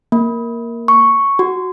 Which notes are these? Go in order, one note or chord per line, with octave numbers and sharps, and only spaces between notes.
A#3
C#6
F#4